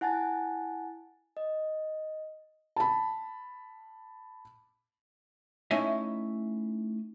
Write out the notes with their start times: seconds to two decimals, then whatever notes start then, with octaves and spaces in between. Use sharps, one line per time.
0.01 E4 F#5 G#5 A5 A6
1.37 D#5
2.76 A5 B5
5.71 A3 C#4 D#4 E4 D#5 E5